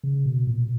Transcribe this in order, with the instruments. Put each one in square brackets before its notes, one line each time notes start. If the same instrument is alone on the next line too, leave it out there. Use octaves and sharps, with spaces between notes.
[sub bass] C#3
B2
A#2